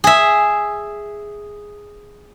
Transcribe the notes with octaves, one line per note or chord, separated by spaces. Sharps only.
G#4 E5